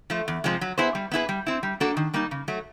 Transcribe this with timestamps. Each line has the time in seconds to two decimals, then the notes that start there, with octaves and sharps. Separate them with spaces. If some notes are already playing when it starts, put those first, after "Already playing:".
0.10 F3 A3
0.28 E2
0.44 C3 F3 G#3
0.61 F#3
0.78 B3 E4 G#4 C5
0.95 G3
1.11 B3 E4 G#4 B4
1.29 G3
1.47 C4 E4
1.63 G3
1.80 A#3 D4 F#4 A4
1.97 D#3
2.14 G3 A#3 D#4
2.31 C#3
2.48 F#3 A3